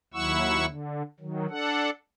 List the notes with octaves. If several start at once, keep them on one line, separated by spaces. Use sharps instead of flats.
D#2 F#3 E4 F#5 C#6 E6
D3
D#3 F#3
D4 A4 F#5